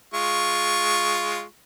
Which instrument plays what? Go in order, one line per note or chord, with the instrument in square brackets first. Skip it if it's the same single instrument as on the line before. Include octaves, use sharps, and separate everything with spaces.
[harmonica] G#3 F4 C#6